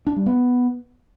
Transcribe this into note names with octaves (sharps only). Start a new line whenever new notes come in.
D4
G3
B3